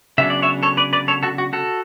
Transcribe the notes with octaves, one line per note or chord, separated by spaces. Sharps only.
C#3 F#3 B3 D4 E5
D5
C#5 E5
A4 C#5
B4 D5
B4 D5
A4 C#5
F#4 A4
F#4
F#4 A4